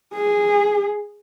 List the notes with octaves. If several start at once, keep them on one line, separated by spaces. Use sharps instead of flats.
G#4